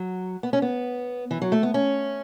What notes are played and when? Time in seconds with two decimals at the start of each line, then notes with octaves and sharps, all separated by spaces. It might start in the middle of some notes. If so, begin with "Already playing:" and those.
Already playing: F#3
0.43 B3
0.53 C#4
0.62 B3
1.31 E3
1.42 F#3
1.52 A3
1.63 B3
1.74 C#4